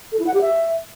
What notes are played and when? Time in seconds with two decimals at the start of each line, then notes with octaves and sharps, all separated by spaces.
0.12 A4
0.19 E4
0.27 F#5
0.34 G4
0.41 E5